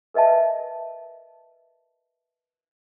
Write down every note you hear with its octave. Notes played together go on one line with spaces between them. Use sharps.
A#4 B4 D#5 E5 A5